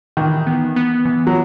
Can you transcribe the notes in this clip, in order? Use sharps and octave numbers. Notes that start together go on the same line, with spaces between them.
D#3 E3
B3
B3
E3
F#3